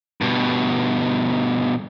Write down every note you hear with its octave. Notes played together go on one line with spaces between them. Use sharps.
G2 B2